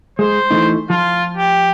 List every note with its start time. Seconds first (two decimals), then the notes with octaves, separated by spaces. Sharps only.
0.19 G#3 C5
0.51 E3 A3 D#4
0.90 F3 F4
1.37 G4